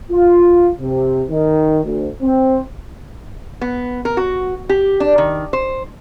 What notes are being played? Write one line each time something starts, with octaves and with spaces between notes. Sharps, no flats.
F4
C3
D#3
D2
C4
B3
A#4
F#4
G4
D4
D#3
C5